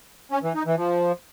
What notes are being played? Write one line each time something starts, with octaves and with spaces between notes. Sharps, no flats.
C#4
E3
D#4
E3
F3